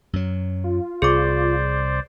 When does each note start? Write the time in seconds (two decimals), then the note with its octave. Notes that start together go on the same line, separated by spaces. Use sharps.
0.13 F#2 F#3
0.64 F4
1.02 C2 G#4 C5 D5 D6